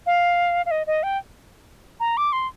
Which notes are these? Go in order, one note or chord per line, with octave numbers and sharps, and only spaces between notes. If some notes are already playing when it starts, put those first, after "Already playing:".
F5
F5
D#5
D#5
G5
A#5
D6
C6